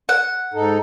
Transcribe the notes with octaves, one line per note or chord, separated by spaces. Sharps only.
F#5
G#2 D#4 A4